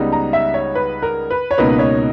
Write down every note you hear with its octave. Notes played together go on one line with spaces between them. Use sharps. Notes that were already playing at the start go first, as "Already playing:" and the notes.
Already playing: C#2 C#3 G3 B3 D#4
A#5
E5
C#5
B4
A#4
B4
C#5
C#2 B2 A#3 D#4 B4
C#5